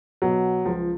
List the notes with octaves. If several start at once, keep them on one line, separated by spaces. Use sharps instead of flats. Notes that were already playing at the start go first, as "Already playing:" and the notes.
B2 F#3
C#2 F3